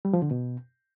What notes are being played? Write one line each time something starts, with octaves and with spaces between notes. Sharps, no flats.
G3
F3
D3
B2